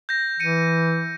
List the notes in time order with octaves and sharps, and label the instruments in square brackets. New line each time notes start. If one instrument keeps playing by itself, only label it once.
[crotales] G6 A#6
[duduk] E3 [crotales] C#7 D#7